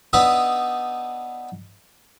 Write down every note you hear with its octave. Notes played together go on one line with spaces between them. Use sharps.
B3 D4 D#4 B4 D#5 E5